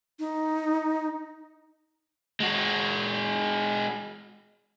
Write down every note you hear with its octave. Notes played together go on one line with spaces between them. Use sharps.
D#4
G#3 F#4